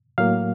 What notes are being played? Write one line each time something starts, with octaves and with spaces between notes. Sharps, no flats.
A2 F#3 A#3 F5